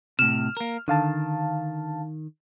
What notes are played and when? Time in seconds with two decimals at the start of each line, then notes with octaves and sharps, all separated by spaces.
0.19 A2 C3 F6 E7
0.57 A#3 A#4
0.88 D3 D#3 F5 A5